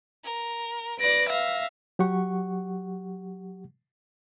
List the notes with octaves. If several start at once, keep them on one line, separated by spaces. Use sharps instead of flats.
A#4
B4 D5 A#6 D7
E5 F5 A#6
F#3 G4 F#5 C#6